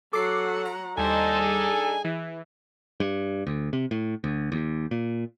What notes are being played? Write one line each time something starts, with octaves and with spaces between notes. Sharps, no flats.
F#3 A4 F#5 D6 C7
A#5
D#2 G3 D4 D#4 A4 C5 D#5 G#5
G#4
E3 E4
G2
D2
C3
A2
D2
D#2
A#2